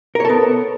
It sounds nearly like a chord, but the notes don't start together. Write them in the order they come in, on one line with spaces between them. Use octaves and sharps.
A#4 C#5 A4 B3